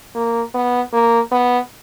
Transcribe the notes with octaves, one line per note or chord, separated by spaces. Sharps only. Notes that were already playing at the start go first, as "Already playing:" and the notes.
A#3
B3
A#3
B3